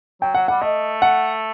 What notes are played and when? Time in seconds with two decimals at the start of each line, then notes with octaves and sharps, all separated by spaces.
0.21 F#3 G5
0.34 F#3 F#5
0.48 G3 F#5
0.61 A3 D#5
1.02 F#5